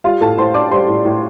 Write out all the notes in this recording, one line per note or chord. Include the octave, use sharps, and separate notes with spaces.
G3 F4 F5
A2 A4 A5
A2 C5 C6
D4 D5 D6
G3 C5 C6
A2
A2